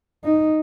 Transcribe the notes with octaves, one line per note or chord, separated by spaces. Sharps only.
D#4